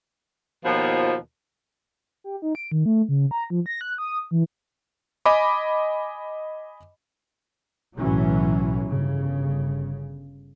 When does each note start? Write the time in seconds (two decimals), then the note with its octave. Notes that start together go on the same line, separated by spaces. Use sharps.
0.64 D#2 B2 F3
2.24 G4
2.42 D#4
2.55 D7
2.72 D#3
2.86 A3
3.09 C#3
3.31 A#5
3.50 F3
3.66 A#6
3.81 F#6
3.98 D#6
4.31 E3
5.25 D#5 G#5 B5 D6
7.98 B1 A2 E3 F#3 C#4
8.87 G1 C#3